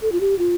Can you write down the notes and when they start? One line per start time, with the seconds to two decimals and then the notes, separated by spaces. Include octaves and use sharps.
0.02 A4
0.12 F4
0.21 G4
0.39 F4